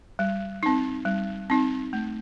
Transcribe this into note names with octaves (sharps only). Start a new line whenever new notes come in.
G3
C4 D#4
G3
C4 D#4
A3